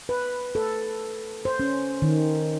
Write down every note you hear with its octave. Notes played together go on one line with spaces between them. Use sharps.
B4
A4
C5
C#4
D#3